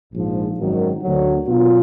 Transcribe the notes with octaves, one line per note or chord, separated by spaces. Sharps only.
A#1 G#2 F3
G#1 F#2 D#3 F#3
D2 D3 F#3
B2 F#3 B3 F4